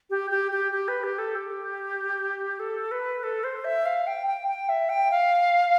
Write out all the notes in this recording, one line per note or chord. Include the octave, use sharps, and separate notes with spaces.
G4
G4
G4
G4
B4
G4
A4
G4
A4
B4
A4
C5
E5
F5
G5
G5
G5
E5
G5
F5